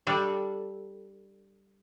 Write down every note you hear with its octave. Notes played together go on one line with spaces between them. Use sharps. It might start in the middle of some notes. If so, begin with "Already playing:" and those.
G3 D4 A4